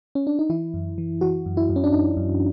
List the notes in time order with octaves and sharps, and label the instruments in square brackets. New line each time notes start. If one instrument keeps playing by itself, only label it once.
[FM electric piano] C#4
D4
D#4
E3 E4
F#2
E3
E3 F#4
F#2
E4
F#2
C#4
D4
F#2 D#4
F#2